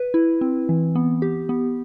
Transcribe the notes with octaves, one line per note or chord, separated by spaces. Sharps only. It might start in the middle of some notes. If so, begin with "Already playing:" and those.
Already playing: B4
E4
C4
E3
B3
G4
B3